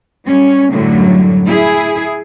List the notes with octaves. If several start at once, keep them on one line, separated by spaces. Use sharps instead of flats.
G3 C#4
F#2 A2 D3 F#3 G3
E4 G#4